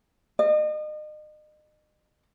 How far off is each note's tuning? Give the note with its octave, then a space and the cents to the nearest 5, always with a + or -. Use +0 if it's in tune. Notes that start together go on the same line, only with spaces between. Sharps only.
D#5 -35